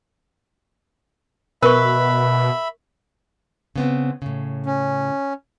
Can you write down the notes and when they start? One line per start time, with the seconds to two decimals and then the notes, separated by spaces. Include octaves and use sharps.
1.62 B2 A#4 B4 E5 B5 C#6
3.76 C#3 B3 C4
4.22 A2 C#3
4.66 C#4